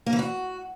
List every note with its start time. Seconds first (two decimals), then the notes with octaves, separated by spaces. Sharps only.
0.06 A#3
0.13 E3
0.19 F#4